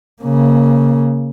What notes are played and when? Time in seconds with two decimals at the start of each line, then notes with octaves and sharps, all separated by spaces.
0.22 C#3 A#3